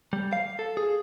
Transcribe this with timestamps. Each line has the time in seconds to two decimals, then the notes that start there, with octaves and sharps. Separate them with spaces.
0.13 G3
0.33 F5
0.59 A4
0.77 G#4